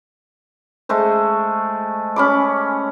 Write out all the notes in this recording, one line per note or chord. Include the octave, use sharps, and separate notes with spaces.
G#3 A3 C5
C#4 B5 D6